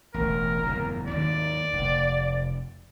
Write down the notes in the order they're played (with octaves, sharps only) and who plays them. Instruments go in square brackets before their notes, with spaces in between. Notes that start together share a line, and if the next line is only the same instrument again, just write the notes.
[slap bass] E1 A1 [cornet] A#4
[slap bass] F#1 E2 A2
[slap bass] D#2 G#2 D#3 [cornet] D5
[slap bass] F1